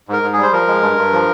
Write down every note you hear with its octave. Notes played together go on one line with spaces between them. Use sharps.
G#2 A#4
G#2
G3 G#4
C5
F3 A#4
G#3
G2
G2
F3